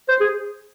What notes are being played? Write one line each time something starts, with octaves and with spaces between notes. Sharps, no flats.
C5
G#4